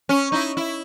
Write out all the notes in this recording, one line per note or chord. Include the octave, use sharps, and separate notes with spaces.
C#4
D#4 E4
E4